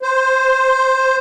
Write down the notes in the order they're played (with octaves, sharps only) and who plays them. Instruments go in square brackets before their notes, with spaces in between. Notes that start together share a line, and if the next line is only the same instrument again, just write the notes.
[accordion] C5